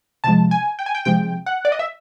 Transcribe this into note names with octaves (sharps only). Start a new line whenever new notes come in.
C3 F3 G#3 A5
G#5
G5
G#5
G5
C3 F3 G#3 G5
F#5
D5
D#5
E5